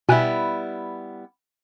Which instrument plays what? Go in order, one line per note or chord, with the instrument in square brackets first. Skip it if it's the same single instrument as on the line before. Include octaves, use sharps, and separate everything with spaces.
[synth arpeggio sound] B2 G#5 F#6 [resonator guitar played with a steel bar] G3 B3 E4